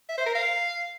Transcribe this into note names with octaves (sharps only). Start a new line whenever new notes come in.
E5
C5
A#4
F5